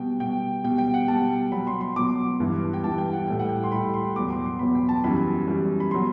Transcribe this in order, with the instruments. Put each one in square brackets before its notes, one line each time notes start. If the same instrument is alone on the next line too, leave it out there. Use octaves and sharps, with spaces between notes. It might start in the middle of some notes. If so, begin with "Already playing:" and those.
Already playing: [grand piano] B2 G3 G5
B2 G3 G5
B2 G3 G5
G5
F#5
B2 G3 A5
B2 F#3 B5
C6
C6
B2 F#3 D6
G2 E3 G3
G5
G2 E3 G3 A5
G5
F#5
A2 G3 G5
F#5
G5
C6
A2 G3 B5
C6
E2 B2 F#3 D6
C6
C6
E2 B2 F#3 B5
G5
A5
F#2 E3 G3 B5
F#2 E3 G3
B5
B2 F#3 C6